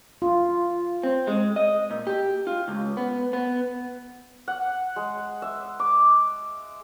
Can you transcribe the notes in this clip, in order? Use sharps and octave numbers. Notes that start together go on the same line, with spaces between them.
F4
C4
G#3
D#5
A#2
G4
F4
C#2
B3
B3
F#5
G#3
E5
D6